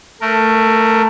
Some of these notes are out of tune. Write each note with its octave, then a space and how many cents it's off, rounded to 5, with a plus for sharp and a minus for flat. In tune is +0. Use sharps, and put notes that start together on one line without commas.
A3 +15 A#4 +0